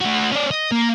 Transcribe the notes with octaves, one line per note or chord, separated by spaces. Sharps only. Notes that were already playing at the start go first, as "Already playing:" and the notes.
A3 F#4
C#4 D5
D#5
A#3